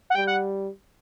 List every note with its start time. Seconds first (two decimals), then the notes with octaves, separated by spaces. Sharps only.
0.10 F#5
0.15 G3 G5
0.27 F#5